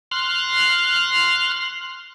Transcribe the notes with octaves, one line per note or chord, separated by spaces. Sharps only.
C6 F6 F#6